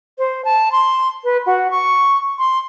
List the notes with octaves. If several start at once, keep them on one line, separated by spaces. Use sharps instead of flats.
C5
A5
C6
B4
F#4
C#6
C6